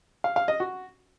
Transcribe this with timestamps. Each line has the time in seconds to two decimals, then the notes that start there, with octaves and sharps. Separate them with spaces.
0.24 F5
0.36 F5
0.48 D#5
0.60 F#4